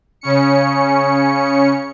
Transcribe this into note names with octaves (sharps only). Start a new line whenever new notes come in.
C#3 C#4 C#7